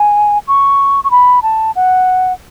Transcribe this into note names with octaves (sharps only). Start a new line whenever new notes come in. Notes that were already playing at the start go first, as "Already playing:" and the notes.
Already playing: G#5
C#6
C#6
B5
A5
F#5